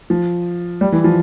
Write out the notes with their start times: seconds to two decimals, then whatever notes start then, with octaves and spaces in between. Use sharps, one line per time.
0.10 F3
0.81 G3
0.92 E3
1.04 F3